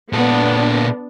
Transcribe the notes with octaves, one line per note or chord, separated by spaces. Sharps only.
A#2 B3 D4 A4